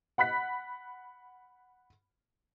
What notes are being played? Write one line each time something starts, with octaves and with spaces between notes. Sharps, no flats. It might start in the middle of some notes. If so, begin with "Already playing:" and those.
F#5 B5 F#6 B6